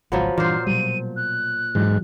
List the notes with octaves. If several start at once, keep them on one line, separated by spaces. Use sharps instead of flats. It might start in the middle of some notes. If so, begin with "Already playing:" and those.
G#1 C#2 F3 F#3 B3
G2 A#2 E3 C5 F6
B2 F#3 G3 D#7
F#6
G#2 E3 F#3